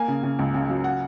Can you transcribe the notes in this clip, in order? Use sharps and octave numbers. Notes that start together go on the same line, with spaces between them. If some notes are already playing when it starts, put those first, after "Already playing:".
Already playing: A#3 G#5
C#3
C#3
C#2
C#3
F#3
F#5